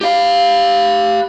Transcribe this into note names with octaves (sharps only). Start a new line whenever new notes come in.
G4 F5